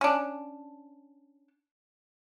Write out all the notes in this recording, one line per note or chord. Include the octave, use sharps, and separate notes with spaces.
C#4 D4